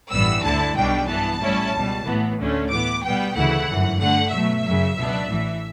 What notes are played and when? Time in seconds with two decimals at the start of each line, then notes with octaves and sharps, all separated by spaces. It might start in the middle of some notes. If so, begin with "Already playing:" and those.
0.11 A1 G2 E3 G3 B3 E6
0.43 D2 D3 A3 E4 A5
0.76 B1 B2 G3 D4 G5
1.08 G2 E3 B3 A5
1.40 A1 A2 G3 C#4 E4
1.74 C#2 B2 G3
2.05 A1 A2 E3 B3
2.38 D2 D3 A3 C#4
2.70 A2 E3 B3 D6
3.03 B2 G3 B3 G5
3.35 D2 C#3 E3 A3 E4 F#5
3.68 G1 F#2 E3
3.99 G2 D3 A3 F#5
4.32 B2 F#3 A3 E5
4.65 F#2 C#3 F#3
4.96 C#2 B2 F#3 B3 D4
5.29 A1 A2 E3